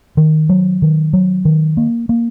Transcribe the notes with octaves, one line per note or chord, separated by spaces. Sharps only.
D#3
F#3
D#3
F#3
D#3
A#3
A#3